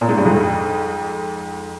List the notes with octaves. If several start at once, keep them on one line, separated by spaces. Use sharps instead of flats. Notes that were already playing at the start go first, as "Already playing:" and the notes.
A#2
G#2
G2
F2 G#2